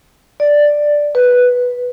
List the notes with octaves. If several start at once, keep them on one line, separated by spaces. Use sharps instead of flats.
D5
B4